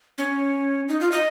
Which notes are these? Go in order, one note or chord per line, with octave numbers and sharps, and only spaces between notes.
C#4
D#4
F4
D#5